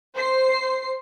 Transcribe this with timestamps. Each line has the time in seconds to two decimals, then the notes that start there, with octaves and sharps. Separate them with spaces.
0.15 C5 C7